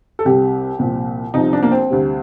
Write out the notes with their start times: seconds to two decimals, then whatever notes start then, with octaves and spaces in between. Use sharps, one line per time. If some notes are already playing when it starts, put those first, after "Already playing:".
0.19 A4
0.25 C2 C3 G3 G4
0.79 C2 A#2 F3
1.34 C2 C3 F3 D#4
1.53 D4
1.63 A#3
1.71 C4
1.89 D2 C3 G3